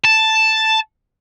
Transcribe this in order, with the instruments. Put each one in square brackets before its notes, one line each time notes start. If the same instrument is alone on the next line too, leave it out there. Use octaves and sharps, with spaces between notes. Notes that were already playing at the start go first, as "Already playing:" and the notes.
[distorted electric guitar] A5